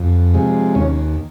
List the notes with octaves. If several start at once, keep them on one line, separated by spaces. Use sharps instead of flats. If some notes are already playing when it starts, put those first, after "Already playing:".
Already playing: F2
C3 F3 G#3
D#2 C#4